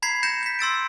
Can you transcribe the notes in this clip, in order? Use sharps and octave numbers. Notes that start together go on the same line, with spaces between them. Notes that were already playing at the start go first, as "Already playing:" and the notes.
A#5 B5 G#6 B6 C7
G6 A#6 C#7 E7
G6 B6
C6 E6 A6 D7